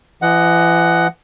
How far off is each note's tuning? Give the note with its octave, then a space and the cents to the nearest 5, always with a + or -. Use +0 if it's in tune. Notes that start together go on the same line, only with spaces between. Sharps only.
E3 +40 D#5 +0 F#5 +10